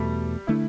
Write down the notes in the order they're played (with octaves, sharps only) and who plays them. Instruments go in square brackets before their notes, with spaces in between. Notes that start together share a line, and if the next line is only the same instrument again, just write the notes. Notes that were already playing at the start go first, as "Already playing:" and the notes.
Already playing: [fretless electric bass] E2 B2 A3 [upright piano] G3
[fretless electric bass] D3 A3 D4 [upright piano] E4